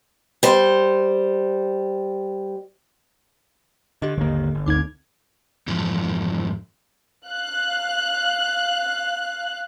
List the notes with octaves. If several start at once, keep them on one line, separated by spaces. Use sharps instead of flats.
G3 C5
D3 G4 D#5
G#1 D#2 D3 A#3
G1
D2 C4 D#4 D6 G#6
F2 G#2 E3 F3
F5 F#6